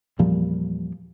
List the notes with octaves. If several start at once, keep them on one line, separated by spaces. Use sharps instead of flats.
E2 A#2 F3 G3